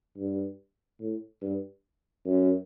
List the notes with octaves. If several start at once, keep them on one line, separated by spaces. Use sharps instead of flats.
G2
A2
G2
F#2